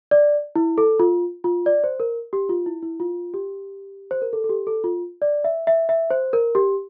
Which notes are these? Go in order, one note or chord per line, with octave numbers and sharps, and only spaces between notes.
D5
E4
A4
F4
F4
D5
C5
A#4
G4
F4
E4
E4
F4
G4
C5
A#4
A4
A4
G4
A4
F4
D5
E5
E5
E5
C5
A#4
G4